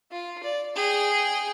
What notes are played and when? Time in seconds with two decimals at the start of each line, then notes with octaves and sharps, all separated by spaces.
0.11 F4
0.43 D5
0.76 G#4 G5